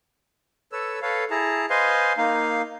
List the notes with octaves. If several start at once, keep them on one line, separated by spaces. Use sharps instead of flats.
A4 B4 C#5 E6
A4 B4 C#5 F5
E4 G#4 A5 A#5
B4 C5 D#5 F5 G#5 C6
A#3 D#4 F5